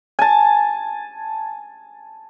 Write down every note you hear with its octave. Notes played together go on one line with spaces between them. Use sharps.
G#5 A5